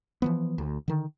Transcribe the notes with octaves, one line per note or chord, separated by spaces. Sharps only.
E3 F3 B3
D2
D3 D#3